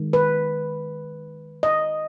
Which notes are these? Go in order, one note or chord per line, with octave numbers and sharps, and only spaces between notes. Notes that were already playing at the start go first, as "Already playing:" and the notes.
Already playing: D#3 G#3
B4
D#5